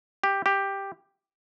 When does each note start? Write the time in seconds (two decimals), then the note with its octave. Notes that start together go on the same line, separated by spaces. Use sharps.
0.24 G4
0.46 G4